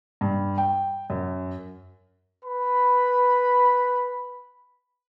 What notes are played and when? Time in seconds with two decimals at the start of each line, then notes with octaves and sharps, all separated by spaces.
0.21 G2
0.58 G5
1.10 F#2
2.45 B4 B5